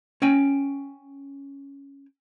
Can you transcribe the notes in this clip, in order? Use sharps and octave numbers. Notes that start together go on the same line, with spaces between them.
C#4 G5 G#5